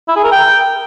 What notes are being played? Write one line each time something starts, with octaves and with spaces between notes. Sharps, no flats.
E4
G#4
A#4
G5